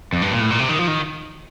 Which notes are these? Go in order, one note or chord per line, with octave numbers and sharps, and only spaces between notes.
F2
G2
A#2
A2
A#2
C3
D#3
F3
D#3